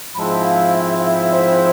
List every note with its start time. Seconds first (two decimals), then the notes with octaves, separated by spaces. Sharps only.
0.15 G#2 F3 G#3 C4 E4 A5 B5
0.44 F5
0.74 E5
1.33 C5